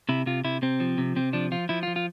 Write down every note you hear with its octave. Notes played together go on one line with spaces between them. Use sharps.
C3 E4
C3 F4
C3 E4
C3 C4
F3
C3
C3 C4
F3 D4
F3 F4
F3 E4
F4
F3
F4